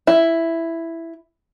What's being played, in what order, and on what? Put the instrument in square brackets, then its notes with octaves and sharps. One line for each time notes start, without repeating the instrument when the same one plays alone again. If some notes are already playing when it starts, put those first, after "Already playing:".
[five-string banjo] E4